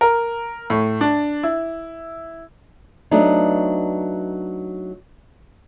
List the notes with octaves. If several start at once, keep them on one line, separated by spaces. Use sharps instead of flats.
A#4
A2
D4
E4
F#3 A3 B3 D4 D#4